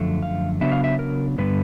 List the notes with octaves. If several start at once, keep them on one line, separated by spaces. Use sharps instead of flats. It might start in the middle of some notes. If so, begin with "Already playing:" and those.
Already playing: F#2 D3 F3 A3
F5
C#3 F#3 B3 D4 E5
F5
E5
A#4
G2 D3 G3 B3 B4